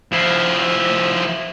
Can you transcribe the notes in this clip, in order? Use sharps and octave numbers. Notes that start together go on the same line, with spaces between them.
F3 E4